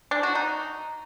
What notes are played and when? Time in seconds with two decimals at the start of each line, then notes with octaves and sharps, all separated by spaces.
0.11 D4
0.23 F#4
0.35 D#4